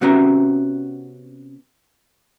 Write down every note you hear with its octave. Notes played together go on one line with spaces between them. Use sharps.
C3 B3 C#4 F#4 E5 A#5